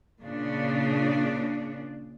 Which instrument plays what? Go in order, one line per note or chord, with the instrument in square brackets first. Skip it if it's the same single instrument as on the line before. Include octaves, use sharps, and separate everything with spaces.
[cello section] A#2 C#3 D4